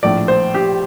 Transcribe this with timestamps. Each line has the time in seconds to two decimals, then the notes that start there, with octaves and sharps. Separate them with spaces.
0.03 A#1 A2 F3 D5
0.28 C5
0.54 G4